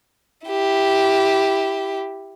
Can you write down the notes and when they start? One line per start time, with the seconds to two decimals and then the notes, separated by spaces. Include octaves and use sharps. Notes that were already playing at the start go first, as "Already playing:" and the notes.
0.47 E4 G4